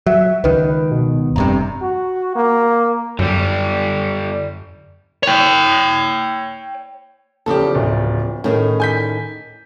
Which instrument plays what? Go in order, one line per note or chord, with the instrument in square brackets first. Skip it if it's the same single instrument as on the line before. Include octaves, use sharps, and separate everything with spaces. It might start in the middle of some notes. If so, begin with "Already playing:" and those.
[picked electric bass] F#3 [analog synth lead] E5
[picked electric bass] C#2 D#3 [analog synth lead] B4
[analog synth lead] B2
[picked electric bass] F1 G2 C3 [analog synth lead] A#5
[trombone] F#4
A#3
[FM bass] F#2 [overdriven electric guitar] D3 G3
[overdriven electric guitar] C#5 G5
[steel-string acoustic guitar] E2 C#3 F3 [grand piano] G4 A4
[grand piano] D1
[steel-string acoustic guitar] A2 D#3 G#4 [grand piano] C#4
[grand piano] G#5 G6 B6